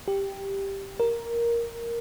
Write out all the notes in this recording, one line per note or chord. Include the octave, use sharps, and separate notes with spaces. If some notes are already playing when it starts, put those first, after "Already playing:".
G4
A#4